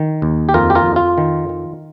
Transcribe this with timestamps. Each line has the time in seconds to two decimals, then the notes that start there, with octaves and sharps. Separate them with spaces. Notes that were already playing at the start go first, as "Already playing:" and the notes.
Already playing: D#3
0.22 D#2
0.49 G4
0.54 F2 F4 A#4
0.70 G4
0.75 F4 A#4
0.86 F2
0.96 F4
1.18 D#3
1.49 D#3